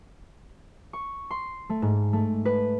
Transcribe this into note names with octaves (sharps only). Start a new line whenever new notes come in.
C#6
C6
A3
G#2
A3
B4